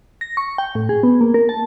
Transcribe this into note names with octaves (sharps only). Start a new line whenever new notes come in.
A#6
C#6
G5
A2
G#4
B3
A#3
A#4
A5